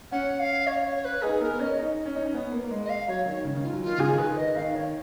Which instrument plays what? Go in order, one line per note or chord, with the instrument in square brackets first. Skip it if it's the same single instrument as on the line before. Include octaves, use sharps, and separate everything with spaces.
[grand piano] C#4 [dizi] F#5
[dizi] F5
C#5
C#5
B4
[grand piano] D#4 [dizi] G#4
[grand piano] B3 [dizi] A#4
[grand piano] C#4 [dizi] D#5
[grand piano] D#4
C#4
D#4
C#4
B3
A#3
A#3
G#3
[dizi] D#5
F5
[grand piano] F#3 [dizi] C#5
[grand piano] D#3 [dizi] C#5
[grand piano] C#3
C#3
[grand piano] D#3 [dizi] F4
[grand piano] F#3
[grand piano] D#3 [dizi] F4
[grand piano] C#3 [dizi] G#4
[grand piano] D#3
[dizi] B4
D#5
[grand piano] D#3 [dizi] F5
[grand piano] D#3 [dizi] C#5